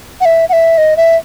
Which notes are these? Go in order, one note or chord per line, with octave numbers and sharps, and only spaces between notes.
F#5
E5
F#5
E5
D#5
E5